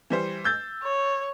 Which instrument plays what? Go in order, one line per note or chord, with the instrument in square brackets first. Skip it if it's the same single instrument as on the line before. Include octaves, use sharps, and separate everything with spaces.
[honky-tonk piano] E3 G3 C5
E6 G6 A6
[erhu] C#5